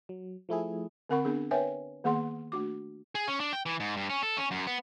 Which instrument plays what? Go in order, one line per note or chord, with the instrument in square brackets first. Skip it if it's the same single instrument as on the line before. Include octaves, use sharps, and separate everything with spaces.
[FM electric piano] F#3
F3 A3 E4 G#4
[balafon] D3 C4 A#4 F#5 B5 C#6
B3 D4 G#4
A#4 B4 C#5 E5 G5 G#5
D#3 A#3 B3 G#4 F#5 C6
A3 D4 F#4 D6
[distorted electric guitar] G#4
C#4
D4
G5
E3
G#2
G2
C#4
A4
C#4
F#2
B3